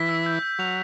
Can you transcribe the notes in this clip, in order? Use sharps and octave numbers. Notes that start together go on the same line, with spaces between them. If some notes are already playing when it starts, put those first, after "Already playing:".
Already playing: E3 B6
E6
G6
G6
F#3 F7